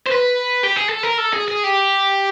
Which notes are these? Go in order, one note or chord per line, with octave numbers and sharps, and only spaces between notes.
C5
B4
G4
G#4
A4
A#4
A4
G#4
G#4
G4